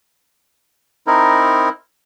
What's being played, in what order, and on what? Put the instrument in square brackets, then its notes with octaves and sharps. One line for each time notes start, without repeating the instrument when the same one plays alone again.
[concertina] C4 D#4 E4 A#4